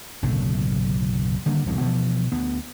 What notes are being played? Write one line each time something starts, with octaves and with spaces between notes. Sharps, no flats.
F#1 B1 A2 D3
D3 D#3 G3 A#3
E1 C2 G2
B2 D3 E3 F3
D2 B3